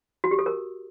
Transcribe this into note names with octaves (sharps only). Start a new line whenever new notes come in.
F#4
G4
A4
A#4